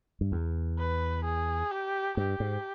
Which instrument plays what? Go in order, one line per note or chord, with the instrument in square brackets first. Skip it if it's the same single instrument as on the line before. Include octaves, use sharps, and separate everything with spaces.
[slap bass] G2
E2
[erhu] B4
G#4
G4
[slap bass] G2 [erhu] G4
[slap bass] G#2